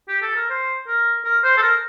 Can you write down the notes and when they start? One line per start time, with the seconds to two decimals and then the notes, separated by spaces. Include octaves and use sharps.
0.09 G4
0.22 A4
0.36 A#4
0.50 C5
0.88 A#4
1.25 A#4
1.44 C5
1.57 A4
1.62 A#4